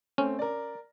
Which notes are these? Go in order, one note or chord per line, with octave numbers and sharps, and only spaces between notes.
A3 C4 C#4
A#4 D5